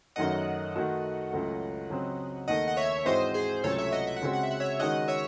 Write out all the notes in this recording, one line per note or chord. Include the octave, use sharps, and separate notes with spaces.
F#2 D#3 F#3 A3 D#5 F#5
D#3 A3 D#4 F#4 A4
C#2 C#3 F#3 A3
C#3 F#3 C4
D#2 D#3 A3 D#4 A4 D#5 F#5
F#5
C#5 E5
G#2 E3 G#3 C4 F#4 C5 D#5
G#4 C5
C#2 C3 F#3 A3 C#4 A4 C#5
C#5 E5
D#5 F#5
E5
F#5
C#3 G#3 C4 F#4 E5
F#5
E5
F#5
C#5 E5
D#3 G#3 C#4 F#4 D#5 F#5
C#5 E5